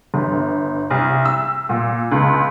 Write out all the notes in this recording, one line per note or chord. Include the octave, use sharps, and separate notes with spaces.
G1
C2
E6
A#2
C#2